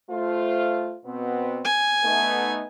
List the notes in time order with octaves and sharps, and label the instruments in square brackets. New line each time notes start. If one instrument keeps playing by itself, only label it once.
[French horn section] A3 F4 C5
B2 B3 C4
[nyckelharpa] G#5
[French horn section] A3 B3 D#4